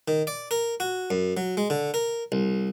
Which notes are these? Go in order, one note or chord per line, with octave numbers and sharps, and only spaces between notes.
D#3
D5
A#4
F#4
F#2
F#3
G#3
D3
A#4
C2